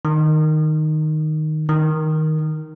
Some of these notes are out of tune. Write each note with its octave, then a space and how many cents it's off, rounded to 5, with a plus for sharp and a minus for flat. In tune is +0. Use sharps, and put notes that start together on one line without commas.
D#3 -10
D#3 +5